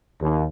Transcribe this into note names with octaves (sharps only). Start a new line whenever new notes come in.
D#2